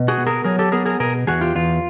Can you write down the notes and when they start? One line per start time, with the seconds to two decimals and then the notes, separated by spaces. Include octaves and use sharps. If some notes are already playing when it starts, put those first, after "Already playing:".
Already playing: B2
0.08 F#4 G#4
0.18 B3
0.27 G#4 A#4
0.44 F#3 G#4 A#4
0.59 G4 A4
0.72 B3 G#4 A#4
0.86 G#4 A#4
1.00 B2 G#4 A#4
1.27 E2 F#4 G#4
1.41 F4 G4
1.55 E2 F4